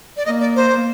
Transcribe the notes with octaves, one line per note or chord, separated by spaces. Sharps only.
D5
A#3 D#5
D5
C5